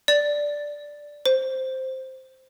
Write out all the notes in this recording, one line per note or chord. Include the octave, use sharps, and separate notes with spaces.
D5
C5